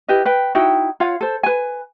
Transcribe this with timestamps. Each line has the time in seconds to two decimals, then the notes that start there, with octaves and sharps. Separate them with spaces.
0.08 E4 G4 B4 D#5
0.25 B4 G5
0.55 D#4 E4 F#4 G5
1.00 F4 C#5 F5 F#5
1.21 A4 C5
1.43 B4 G#5